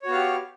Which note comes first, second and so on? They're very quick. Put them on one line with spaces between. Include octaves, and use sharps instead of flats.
C#5 F#4 B3 F5 G4